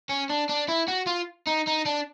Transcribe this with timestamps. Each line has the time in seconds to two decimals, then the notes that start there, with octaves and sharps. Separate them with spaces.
0.09 C#4
0.29 D4
0.49 D4
0.68 E4
0.88 F#4
1.07 F4
1.47 D#4
1.67 D#4
1.86 D4